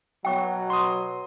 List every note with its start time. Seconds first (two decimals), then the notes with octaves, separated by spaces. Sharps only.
0.25 B2 F#3 G5 C#6
0.70 C6 D#6